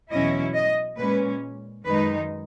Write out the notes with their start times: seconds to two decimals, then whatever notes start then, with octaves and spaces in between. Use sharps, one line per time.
0.11 E2 B2 F#3 C#4 E4 D#5
0.55 D#5
0.98 A#2 G#3 C#4 B4
1.85 F#2 D#3 G#3 D#4 B4